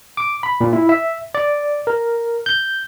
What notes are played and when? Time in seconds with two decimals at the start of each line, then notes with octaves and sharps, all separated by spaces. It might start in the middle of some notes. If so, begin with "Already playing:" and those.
0.17 D6
0.43 B5
0.61 A#2
0.73 E4
0.89 E5
1.35 D5
1.87 A#4
2.46 G6